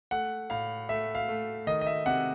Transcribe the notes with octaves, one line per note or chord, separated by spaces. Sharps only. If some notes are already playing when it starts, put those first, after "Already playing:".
A3 F#5
A2 F5
A3 E5
F5
A3
D#3 D#5
D#5
E5
C3 F#5